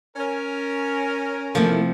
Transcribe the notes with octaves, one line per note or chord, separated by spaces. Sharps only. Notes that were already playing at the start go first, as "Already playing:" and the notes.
C#4 A#4
C3 F3 A3 A#3 E4